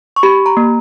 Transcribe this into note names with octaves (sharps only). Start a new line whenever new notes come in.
C#6
G4 B5
A#5
A#3